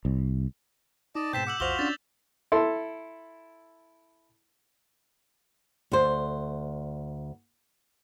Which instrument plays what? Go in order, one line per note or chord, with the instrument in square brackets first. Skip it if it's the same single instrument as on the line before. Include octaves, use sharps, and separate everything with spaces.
[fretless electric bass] C2
[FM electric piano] D#4 [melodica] D5 D#5 A5
[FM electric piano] G#2 B2 [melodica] C4 A5 C6 [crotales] G6 B6 E7
[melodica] F#5 [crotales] D6 E6 F#7
[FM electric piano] B1 F2 C5 [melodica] F4 F#4 [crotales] F7 G7
[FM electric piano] C#4 D4 [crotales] A6
[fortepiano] E4 A4 C6
[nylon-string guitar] D2 C5